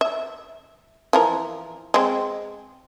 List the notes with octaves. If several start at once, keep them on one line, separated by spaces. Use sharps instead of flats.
E5
E3 F3 A#4
G#3 C4